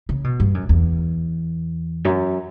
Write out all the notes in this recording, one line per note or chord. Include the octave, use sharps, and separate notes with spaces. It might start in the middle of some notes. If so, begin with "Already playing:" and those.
C#3
B2
G2
F#2
E2
F#2